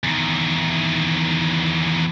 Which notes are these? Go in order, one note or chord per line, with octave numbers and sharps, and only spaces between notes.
E2 D#3